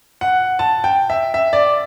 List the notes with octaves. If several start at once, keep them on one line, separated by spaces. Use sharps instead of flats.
F#5
A5
G5
E5
E5
D5